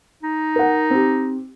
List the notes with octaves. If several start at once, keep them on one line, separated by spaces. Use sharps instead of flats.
D#4
A#4 F#5
C4 G4